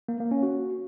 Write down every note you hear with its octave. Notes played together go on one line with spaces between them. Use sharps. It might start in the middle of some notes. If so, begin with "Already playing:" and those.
A#3
A#3
C#4
F#4